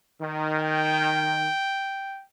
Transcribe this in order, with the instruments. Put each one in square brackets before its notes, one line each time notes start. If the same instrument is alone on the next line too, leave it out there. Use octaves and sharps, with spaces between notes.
[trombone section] D#3
[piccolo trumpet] G5